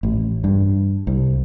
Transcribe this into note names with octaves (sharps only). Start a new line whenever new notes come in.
A1
G2
C2